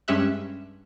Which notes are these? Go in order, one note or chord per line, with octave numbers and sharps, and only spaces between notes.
G2 G#3 C#4 G4 E5 F#6